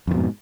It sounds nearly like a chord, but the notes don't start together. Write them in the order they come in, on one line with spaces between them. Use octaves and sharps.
F2 D#3 B2 G#2